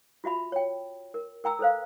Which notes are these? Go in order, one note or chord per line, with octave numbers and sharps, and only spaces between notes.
F4 F#4 E5 B5
C#5 G5
A#4
A#4 G5 A#5 E6
A4 B4 C5 F5